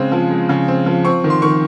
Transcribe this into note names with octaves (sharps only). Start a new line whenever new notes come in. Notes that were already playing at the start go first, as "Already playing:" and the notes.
Already playing: C#3 G#3 C4
F3
G#3
C#3
C4
F3
C4 C#6
D#3
C6
D#3 C#6